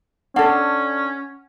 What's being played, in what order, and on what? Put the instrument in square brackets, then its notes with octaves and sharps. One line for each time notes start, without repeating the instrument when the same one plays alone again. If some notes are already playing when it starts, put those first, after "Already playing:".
[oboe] C#4 [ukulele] D4 A4 [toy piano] F#5